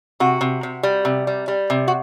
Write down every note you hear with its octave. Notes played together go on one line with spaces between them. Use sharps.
C3 F#4
C3
C3
G3
C3
G3
G3
C3
F#4